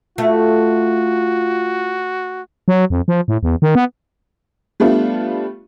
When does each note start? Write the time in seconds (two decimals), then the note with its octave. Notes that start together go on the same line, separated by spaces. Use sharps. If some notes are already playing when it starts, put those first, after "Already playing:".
0.18 A3 F4 F#4
2.68 F#3
2.90 F2
3.08 F3
3.28 A2
3.43 E2
3.62 D#3
3.75 B3
4.80 G3 A3 B3 D4 F4